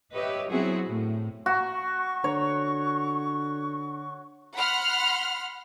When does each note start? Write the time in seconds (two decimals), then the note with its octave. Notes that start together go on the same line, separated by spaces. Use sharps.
0.13 G4 B4 C#5 D#5 E5
0.50 F#3 B3 C4 E4 F#4 G#4
0.86 A2
1.46 F#4 C#6
2.24 D3 C#5
4.56 F#5 B5 C6 F6